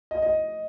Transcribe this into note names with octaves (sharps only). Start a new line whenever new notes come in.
D#5
D#5